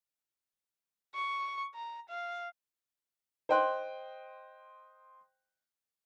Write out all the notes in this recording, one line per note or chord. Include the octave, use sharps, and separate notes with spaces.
C#6
A#5
F5
C5 D#5 G5 C6 F#6